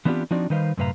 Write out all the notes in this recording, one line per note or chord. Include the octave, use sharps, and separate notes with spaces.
E3 B3 C4 D4 F4 G4
F3 C4 D4 D#4 F#4 D5
D#3 G3 D#4 B4 C5 F5
F#2 A2 C3 B4 F5 A#5